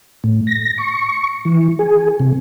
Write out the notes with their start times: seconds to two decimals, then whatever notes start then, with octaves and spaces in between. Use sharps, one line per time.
0.24 A2
0.47 A#6
0.78 C#6
1.45 E3
1.79 G#4
2.20 C3